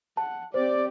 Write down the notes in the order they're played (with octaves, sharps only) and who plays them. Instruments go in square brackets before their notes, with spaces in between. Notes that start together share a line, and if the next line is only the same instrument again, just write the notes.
[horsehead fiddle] F#5 [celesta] A5
[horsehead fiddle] C4 G4 [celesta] C5 [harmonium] D5